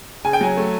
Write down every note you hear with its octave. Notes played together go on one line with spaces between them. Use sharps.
C#3 G#5
G5
F#3 G#5
A3